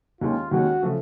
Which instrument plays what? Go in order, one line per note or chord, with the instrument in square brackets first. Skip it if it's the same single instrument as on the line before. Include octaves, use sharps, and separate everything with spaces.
[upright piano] D#2 D#3 G#3 C#4 [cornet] F4
[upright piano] D#2 D#3 G#3 C#4 [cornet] F#4
[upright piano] C#3 F3 A3